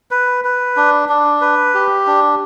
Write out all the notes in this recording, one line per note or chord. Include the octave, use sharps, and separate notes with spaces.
B4
B4
D4
D4
B4
G4
D4